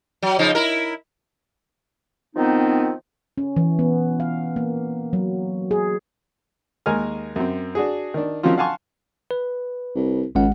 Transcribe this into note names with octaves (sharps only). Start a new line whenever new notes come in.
F#3
C#3 F3 D#4
E4 A#4
D#3 F3 B3 C4 D#4
C#4
E3
B3
F5
A#3
F#3
G#4
D#2 G#3 A#4 G#5 F6
F#2 C4
D4 F#4 G#4
D#3 D4
D#3 F3 F#3 C4 C#4 F4
F5 F#5 G#5 A5 C6 C#6
B4
C2
G#1 C#2 G#3 F#5